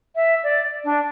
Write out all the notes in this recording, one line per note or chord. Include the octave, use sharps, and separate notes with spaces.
E5
D5
D4